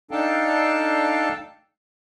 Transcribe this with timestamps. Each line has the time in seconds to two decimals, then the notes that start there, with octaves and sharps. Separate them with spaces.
0.11 D4 D#4 A4 F5 G5 A5